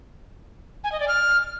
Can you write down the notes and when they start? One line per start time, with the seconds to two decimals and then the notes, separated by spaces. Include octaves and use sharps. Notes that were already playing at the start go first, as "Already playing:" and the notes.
0.84 G#5
0.92 D#5
1.00 D5
1.08 F6